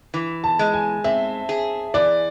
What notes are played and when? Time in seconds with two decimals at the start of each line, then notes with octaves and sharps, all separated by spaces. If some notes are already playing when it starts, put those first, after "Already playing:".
0.14 E3
0.44 A5
0.59 G#3
0.74 G#5
1.04 C4 E5
1.49 G#4
1.94 E3 D5